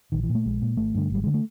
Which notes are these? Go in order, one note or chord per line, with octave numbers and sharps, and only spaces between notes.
A#1 D#3
E3
A#2
A3
A#1 G#3
A#2
G#1 A3
G2 D3
G#1 G3
G#3
D3
A3